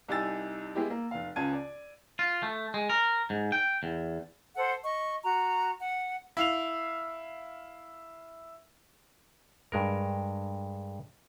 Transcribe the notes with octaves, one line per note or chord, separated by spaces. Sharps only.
C2 D#4 G4 G#5 E6 A6
G#3 B3 E4 G4
A#3
F1 F5
C#2 C#3 F4 A5 G#6 D#7
D5
F4
A3
G#3
A#4
G#2
G5
E2
A4 C5 F#5
D#5 C#6
F#4 A#5
F#5
E4 F5 F7
G2 G#3 A#4